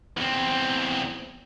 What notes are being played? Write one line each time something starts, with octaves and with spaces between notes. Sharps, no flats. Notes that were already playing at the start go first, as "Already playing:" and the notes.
E2 C4